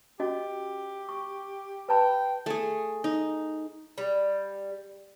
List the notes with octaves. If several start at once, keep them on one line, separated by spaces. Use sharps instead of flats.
C#4 F#4 G4 D#5
C#6
B4 G5 A5 B5
A3 G#4
D#4
G3